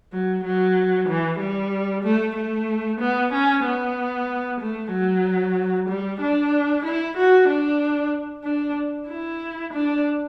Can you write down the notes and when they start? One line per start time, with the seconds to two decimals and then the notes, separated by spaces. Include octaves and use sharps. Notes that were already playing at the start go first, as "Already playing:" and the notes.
0.13 F#3
0.45 F#3
1.08 E3
1.40 G3
2.04 A3
2.36 A3
3.01 B3
3.32 C#4
3.65 B3
4.60 A3
4.92 F#3
5.89 G3
6.21 D4
6.85 E4
7.17 F#4
7.49 D4
8.44 D4
9.08 E4
9.73 D4